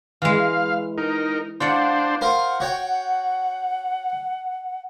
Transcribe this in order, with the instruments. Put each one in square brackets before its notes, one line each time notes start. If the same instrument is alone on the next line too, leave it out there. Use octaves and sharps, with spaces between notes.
[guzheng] E3 G#3 [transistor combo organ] F5
[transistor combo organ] D#4 A#4
[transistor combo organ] D4 C5 [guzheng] F4 D5 F#5
[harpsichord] F4 A#4 C5 [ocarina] F#5
[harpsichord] F#4 C#5 G5